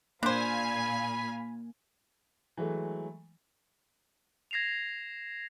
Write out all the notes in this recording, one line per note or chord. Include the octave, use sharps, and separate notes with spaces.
A#2 A#3 D4 C5 F5 G#5 B5
E3 F#3 G#3 A3
G#6 A#6 C7 E7 F7